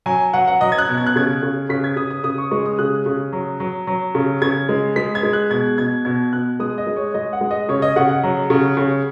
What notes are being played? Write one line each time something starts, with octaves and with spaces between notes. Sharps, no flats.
F#3 G#5
F#3 F#5
F#5
F#3 D#5
G#6
F#6
B2
G#6
F#6
C#3 G#6
C#3
C#3 B6
G#6
C#3 D#6
D#6
C#3 D#6
C#6
G#3 C#6
D#6
C#3 F#6
C#3
F#3
F#3
F#3
C#3
C#3 G#6
G#3
G#3 B6
G#6
G#3
F#6
B2 G#6
B2 G#6
B2 G#6
B2 F#6
G#3 D#6
D#5
G#3
C#5
G#3 D#5
F#5
G#3
D#5
C#3 C#5
D#5
C#3 F#5
F#5
F#3
C#3
C#3